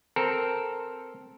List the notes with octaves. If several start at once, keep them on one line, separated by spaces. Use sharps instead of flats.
C4 A4 A#4